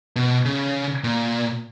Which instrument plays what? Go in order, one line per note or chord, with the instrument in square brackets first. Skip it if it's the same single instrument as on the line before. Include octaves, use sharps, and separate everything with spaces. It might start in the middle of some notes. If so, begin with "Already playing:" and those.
[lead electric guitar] B2
C#3
A#2